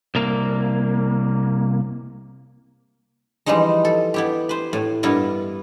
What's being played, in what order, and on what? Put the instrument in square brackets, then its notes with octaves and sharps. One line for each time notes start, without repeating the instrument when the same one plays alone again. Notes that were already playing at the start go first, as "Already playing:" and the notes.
[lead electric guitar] C2 A#3
[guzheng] E3 F3 G3 G#3 D#4
A4
B3 E4 G4
B4 C5
A2
G2 B3 E4 A#4 B4 A5